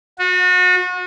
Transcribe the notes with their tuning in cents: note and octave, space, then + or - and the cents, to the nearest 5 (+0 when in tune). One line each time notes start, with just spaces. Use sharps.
F#4 -35